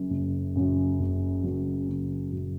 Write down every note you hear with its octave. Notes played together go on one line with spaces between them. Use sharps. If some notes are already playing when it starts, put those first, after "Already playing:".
Already playing: F#1 F#2 C#3 F#3
F#1
F#2 C#3 F#3
F#1
F#2 C#3 F#3
F#1
F#2 C#3 F#3